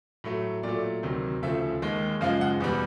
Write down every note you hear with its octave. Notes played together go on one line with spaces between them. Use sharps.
A2 F#3 A3
A#2 F#3 A3 D5
D2 C3 D#3 F#3
D2 C#3 F3 A3 E5
D#2 D#3 G#3
F#2 C#3 F3 G#3 F5
F#5
E2 B2 G3